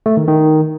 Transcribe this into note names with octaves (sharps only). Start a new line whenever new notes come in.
A3
D#3
D#3